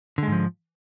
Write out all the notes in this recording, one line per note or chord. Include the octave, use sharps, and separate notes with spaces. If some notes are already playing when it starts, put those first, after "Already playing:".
G#2 D3 F3 G#3